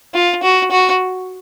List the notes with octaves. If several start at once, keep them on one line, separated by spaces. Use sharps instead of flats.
F4
F#4
F#4